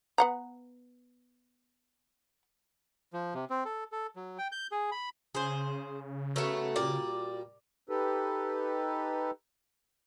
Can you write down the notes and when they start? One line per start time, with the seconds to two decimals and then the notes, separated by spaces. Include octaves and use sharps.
0.18 B3 F#5 A#5
3.13 F3
3.34 C3
3.50 C4
3.65 A4
3.92 A4
4.16 F#3
4.38 G5
4.52 G6
4.72 G#4
4.92 B5
5.35 C#3 G#4 C5
6.36 A3 B3 F#4 A4 A#4 C#5
6.76 A#2 G3 A#4 D5
7.89 D#4 G4 A4 B4